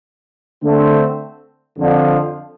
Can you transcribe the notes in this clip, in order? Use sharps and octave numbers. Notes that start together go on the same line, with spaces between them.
D3 A3 C4
F2 D3 F3